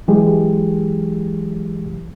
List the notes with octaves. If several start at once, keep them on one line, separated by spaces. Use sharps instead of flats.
E3 F#3 G#3 G4 G#4